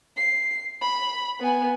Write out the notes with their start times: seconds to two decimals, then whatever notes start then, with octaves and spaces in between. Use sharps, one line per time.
0.17 C7
0.81 B5
1.40 B3 G#5